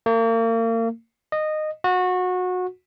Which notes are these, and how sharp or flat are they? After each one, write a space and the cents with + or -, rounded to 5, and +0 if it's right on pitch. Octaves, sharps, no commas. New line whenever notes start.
A#3 -35
D#5 -15
F#4 -25